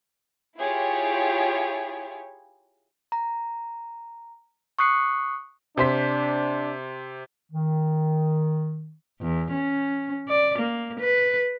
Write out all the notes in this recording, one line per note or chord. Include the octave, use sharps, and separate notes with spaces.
E4 F4 G4 G#4 C#5
A#5
C#6 D#6 F#6 C7 C#7
C3 D4 C5 B6
D#3
E2
C#4
D5
A#3
B4